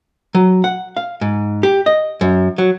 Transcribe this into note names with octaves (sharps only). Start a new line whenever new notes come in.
F#3
F#5
F5
G#2
G4
D#5
F#2
F#3